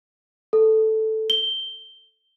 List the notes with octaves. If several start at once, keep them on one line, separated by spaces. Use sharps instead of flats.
A4
G7